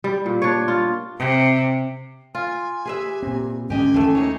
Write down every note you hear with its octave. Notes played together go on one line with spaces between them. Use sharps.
G3
A#2
D4 C#5
F4
C3
F4 G#5
G4 G#4 B4 E5
A#2 C4
G#2 D3 A3 C#4 G4 D#5 G#5
D#2 D#3 E3 A3
D#4 G#4 C#5